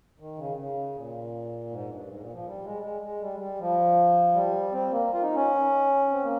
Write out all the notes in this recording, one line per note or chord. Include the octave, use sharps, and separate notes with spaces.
D#3
C#3
C#3
A#2
G#2
G2
G#2
A#2
F3
G3
G#3
G#3
G#3
G3
G3
F3
G3
C4
A#3
F4
D#4
C#4
C4
A#3